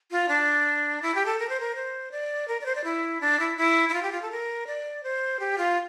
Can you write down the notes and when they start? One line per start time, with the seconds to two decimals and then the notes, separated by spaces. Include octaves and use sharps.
0.11 F4
0.28 D4
1.02 E4
1.15 G4
1.26 A4
1.39 A#4
1.49 C5
1.60 A#4
1.75 C5
2.11 D5
2.48 A#4
2.61 D5
2.66 C5
2.75 D5
2.84 E4
3.21 D4
3.39 E4
3.57 E4
3.89 E4
3.93 F4
4.02 G4
4.12 F4
4.22 A4
4.31 A#4
4.67 D5
5.03 C5
5.40 G4
5.58 F4